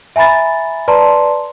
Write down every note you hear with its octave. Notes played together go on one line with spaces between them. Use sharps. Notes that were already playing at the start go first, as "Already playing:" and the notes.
E5 G#5 A#5 B5 A6
B4 D5 A5 A#5 C6